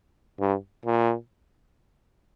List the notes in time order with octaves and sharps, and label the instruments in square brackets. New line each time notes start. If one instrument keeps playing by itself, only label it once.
[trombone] G2
A#2